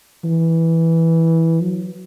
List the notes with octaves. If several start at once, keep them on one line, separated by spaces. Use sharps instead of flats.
E3
F#3